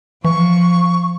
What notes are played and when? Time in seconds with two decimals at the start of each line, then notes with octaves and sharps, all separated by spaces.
0.25 E3 F3 C#6